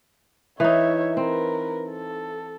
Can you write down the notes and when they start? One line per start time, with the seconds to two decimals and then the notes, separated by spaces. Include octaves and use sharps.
0.60 E3 D#4 C#5 E5
1.17 C4 A#4 B4
1.90 A4